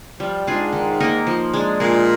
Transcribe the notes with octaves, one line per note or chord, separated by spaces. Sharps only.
F3 G3
G#2 D4 F4 G#4
D#3
A#3 D#4 A#4
F3
G#3 D4
A#2 G#3